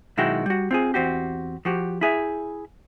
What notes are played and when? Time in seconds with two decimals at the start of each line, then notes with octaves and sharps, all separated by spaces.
0.17 B1 D#3 G#3 E4 F#4 G5
0.46 G3 F#4
0.71 C4 F4 G#4
0.94 E2 C4 F#4 G4
1.65 F3 F#4 G4
2.01 E4 G#4 E5